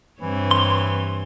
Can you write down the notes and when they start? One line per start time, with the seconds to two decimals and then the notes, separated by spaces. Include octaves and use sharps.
0.21 G2 E3 C4 C#5
0.51 C6